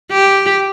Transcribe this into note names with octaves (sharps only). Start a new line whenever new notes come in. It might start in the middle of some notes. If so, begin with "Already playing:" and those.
G4